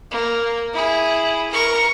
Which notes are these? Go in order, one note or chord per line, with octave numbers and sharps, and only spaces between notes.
A#3
E4 G#4
A#4 C#6